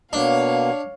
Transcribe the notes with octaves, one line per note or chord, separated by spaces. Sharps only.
B2 A#3 D4 C#5 F5